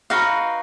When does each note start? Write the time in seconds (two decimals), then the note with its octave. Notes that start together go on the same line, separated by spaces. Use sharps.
0.10 D#4 F#4 B4 F5 G5